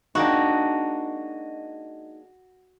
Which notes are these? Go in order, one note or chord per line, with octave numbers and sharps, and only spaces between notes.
G#3 A#3 D4 D#4 F#4 G5